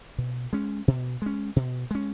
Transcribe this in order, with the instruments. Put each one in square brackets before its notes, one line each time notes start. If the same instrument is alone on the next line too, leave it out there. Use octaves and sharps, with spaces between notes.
[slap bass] B2
G#3 C#4
B2
G#3 C#4
B2
G#3 C#4